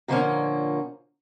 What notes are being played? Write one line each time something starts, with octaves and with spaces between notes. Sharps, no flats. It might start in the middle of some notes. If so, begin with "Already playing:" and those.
A#2 D3 F3 A3 A#3 C#4